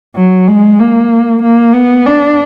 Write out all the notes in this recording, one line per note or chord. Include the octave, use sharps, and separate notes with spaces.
F#3
G#3
A#3
A#3
B3
D4